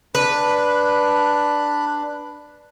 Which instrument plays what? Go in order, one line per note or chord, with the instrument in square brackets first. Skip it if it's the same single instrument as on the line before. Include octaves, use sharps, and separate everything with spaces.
[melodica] D4 [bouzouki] B4 [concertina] B5 F#6